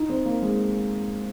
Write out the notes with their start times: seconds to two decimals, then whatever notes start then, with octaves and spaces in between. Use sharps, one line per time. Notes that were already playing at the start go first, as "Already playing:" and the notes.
Already playing: D#4
0.09 C4
0.25 A#3
0.42 G#3